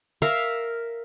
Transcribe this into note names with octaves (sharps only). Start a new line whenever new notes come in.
A#4 E5 F5